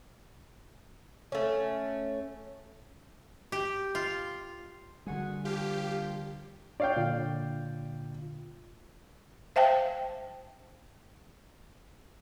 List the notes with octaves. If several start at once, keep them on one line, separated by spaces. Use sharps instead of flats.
A3 C#4
G4
F4
A#2 D3 G3 F#4 G#4
F3 A#3 F4 G4
D4 C#5 D5 F5 G5
A#2 D3 F4
C5 E5 F5 G5 A5